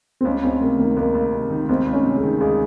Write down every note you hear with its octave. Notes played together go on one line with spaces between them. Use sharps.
C4
C#2 C#4
C#2 C4
C3 A#3
D#3 A#3
C#2 A#3
C#2
C3
D#3
C#2 C4
C#2
C#4
C3
G#4
D#3
C#2 G#4